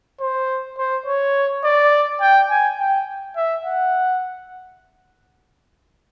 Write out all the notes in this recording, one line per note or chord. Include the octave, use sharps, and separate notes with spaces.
C5
C5
C#5
D5
G5
G#5
G5
E5
F#5